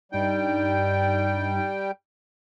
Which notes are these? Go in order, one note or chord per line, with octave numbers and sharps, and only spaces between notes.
G2 G3 D#4 G5